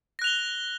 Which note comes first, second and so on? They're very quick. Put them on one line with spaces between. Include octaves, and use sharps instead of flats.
A#6 F#6 F7 G7